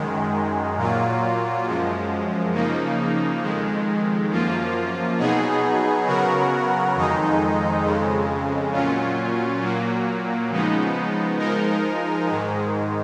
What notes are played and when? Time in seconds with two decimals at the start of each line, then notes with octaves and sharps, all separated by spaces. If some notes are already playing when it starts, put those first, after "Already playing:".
Already playing: F#2 D#3 G#3
0.76 A#2 F#3 A#3 F4
1.65 F#2 F3 G#3
2.53 C#3 F3 A#3 D#4
3.42 F2 D#3 G#3
4.30 F#2 F3 A#3 F4
5.19 B2 F#3 B3 D#4 G#4
6.07 C#3 F#3 B3 F#4 A#4
6.96 F2 D#3 G#3 D#4
7.84 F2 C#3 G#3
8.73 A#2 F#3 C#4 F4
9.62 A#2 F#3 A#3
10.49 C#3 F3 G#3 B3 D#4
11.38 F3 G#3 D#4 A#4
12.26 G#2 D#3 G#3